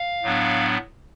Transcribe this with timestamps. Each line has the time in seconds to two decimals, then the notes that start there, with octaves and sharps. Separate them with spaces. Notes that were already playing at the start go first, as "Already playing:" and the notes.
Already playing: F5
0.23 A2 F#3 B3 D4